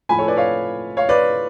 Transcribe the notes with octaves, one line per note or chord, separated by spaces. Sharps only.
A2 F3 G#5 B5
A4 C#5
B4 D5
C#5 F5
C#5 F5
B4 D5